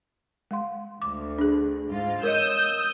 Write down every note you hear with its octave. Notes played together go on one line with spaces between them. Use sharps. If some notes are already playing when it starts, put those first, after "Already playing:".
G#3 F5 C6
D2 D6
D4 G#4
G#2 F4
A#4 C#5 D#5 D#6 E6 G6